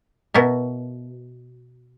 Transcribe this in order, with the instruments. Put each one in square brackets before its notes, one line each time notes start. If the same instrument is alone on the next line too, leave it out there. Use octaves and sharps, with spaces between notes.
[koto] B2 E4 A#4